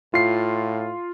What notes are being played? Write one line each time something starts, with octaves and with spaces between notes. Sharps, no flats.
A2 F4 C7